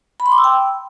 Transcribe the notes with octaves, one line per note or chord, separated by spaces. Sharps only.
B5
C6
D6
E6
G5